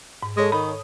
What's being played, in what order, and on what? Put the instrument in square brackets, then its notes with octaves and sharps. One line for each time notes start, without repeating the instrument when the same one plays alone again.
[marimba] G#2
[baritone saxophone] G#3 [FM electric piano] A4 C#5 D#6
[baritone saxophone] D#3 [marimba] B5